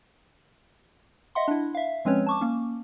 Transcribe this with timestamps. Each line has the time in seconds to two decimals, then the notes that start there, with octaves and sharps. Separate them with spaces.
1.35 D#5 E5 F#5 C6
1.48 D4 E4
1.75 E5 F5
2.05 F3 G#3 C4 C#4 B4 C#5
2.27 A5 C#6 D6
2.41 A#3 C#4